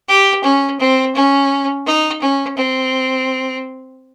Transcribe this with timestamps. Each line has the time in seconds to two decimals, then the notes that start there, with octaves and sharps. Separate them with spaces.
0.08 G4
0.44 C#4
0.80 C4
1.15 C#4
1.86 D#4
2.22 C#4
2.57 C4